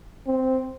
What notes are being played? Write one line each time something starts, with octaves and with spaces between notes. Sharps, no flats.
C4